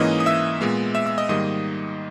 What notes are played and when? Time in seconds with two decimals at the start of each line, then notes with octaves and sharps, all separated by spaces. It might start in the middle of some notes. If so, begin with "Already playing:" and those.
Already playing: G#2 E3 A#3 C#4 D#5 D#6
0.20 D#6
0.26 E5 E6
0.61 A#2 G#3 B3
0.95 E5 E6
1.06 E5 E6
1.18 D#5 D#6
1.29 G#2 D#3 G3 A#3 D#5 D#6